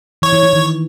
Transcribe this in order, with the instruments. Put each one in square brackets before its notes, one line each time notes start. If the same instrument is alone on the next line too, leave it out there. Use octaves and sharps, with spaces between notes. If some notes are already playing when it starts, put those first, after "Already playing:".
[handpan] E3 [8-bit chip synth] C#5
[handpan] E3
E3
D#3